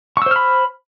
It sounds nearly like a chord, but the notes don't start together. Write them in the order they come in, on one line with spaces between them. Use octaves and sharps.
C#6 E6 C5 F6 B5